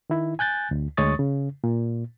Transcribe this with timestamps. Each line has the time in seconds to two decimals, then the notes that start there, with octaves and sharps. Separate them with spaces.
0.10 D#3 E4
0.39 G#5 F#6 G6 A6
0.71 D2
0.97 D2 G#3 C#5 C#6 D#6 A6
1.19 C#3
1.64 A#2